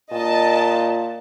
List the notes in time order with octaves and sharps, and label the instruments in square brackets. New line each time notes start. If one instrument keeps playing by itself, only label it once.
[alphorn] A#2 [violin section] D#5 A5